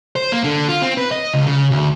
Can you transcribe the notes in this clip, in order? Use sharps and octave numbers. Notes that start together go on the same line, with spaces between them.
C5
A#3
D3
F4
C4
B4
D#5
C#2
C#3
D2